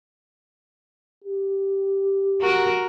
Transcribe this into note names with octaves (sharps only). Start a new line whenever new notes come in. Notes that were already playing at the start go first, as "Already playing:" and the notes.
G4
F#4 A#4